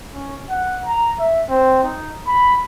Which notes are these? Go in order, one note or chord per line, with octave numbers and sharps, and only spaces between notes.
C#4
F#5
A#5
E5
C4
D#4
B5